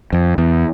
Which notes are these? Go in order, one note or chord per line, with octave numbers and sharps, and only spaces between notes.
F2
E2